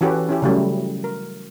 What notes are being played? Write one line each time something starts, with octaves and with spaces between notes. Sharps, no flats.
E3 C#4 F#4 G4 A4 B4
C#4 E4 G4
C#3 F#3 G3 A3
A#4